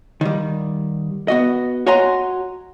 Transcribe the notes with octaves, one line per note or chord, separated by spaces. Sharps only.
D#3 G3
B3 F#4 D#5
F#4 C#5 D#5 G#5 A#5 C6